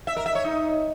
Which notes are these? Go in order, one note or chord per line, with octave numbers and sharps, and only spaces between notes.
E5
A#4
E5
C#5
D#4